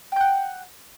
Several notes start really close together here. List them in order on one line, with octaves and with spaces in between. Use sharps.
G5 G6 F#5